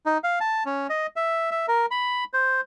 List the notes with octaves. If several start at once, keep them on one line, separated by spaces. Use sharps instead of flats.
D#4
F5
A5
C#4
D#5
E5
E5
A#4
B5
C5